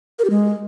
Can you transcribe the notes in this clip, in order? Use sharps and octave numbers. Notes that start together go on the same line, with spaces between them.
A#4
G4
G#3